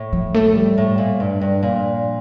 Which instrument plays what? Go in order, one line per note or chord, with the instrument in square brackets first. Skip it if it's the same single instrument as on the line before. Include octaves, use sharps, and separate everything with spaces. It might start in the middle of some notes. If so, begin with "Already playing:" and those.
Already playing: [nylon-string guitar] A2
[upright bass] F3
A3
G3
[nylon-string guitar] A2
A#2
G2
G2
[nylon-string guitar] A#2 [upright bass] F3